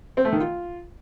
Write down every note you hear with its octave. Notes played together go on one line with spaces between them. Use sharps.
C4
A3
D#3
F4